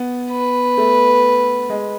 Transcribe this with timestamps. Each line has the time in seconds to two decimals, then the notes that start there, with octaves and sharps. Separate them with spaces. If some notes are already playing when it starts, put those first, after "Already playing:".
Already playing: B3
0.31 B4
0.78 A3
1.69 G#3